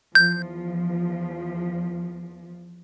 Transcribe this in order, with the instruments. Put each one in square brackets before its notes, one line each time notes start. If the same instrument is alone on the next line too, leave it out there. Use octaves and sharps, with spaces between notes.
[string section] E2 F3 [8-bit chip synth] G6